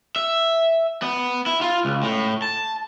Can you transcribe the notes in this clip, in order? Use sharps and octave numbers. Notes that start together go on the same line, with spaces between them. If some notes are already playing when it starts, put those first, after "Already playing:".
E5
B3
E4
F4
C#2
A2
A5